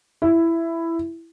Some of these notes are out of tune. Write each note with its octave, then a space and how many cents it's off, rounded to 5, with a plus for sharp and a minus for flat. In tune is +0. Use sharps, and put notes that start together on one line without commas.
E4 +10